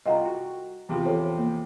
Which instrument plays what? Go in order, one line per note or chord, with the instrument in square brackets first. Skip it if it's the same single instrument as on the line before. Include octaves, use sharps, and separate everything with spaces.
[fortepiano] C2 F4 [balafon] D#5 F#5 A#5
[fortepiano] F#4
E2 C3 F3
[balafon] A4 C5 C#5
A#3